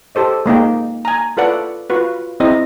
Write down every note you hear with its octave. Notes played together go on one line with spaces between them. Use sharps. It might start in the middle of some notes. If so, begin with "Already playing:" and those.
G4 A4 C5 D#5
G#3 A#3 D#4 G5
G#5 A#5
F4 A4 B4 D5 F#5
F4 F#4 B4
C4 E4 G#4 C5 D#5